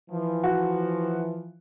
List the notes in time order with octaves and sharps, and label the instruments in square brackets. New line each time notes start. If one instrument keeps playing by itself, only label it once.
[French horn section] E3 F3
[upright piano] F#4